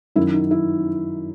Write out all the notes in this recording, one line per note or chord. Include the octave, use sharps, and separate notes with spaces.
F#2 D#3 F#3 E4
D#4
E4